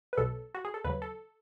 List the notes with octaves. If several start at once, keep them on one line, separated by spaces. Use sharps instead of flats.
B4
B1 B2 F#3 A4
F#4
G#4
A4
D#2 C#3 F#3 B4
A4